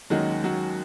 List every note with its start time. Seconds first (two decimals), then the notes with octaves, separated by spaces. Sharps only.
0.10 D#2 D#3 F#3 G#3 C#4 F#4
0.44 F#3 F#4